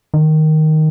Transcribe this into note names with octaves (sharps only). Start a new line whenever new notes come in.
D#3